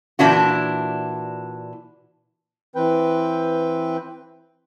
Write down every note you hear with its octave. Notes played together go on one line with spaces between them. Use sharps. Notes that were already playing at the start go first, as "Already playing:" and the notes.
A#2 E3 D4 E4 F#4
E3 C4 B4 G5